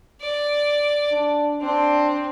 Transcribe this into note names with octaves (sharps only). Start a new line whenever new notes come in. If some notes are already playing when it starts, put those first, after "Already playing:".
D5
D4
C4 D4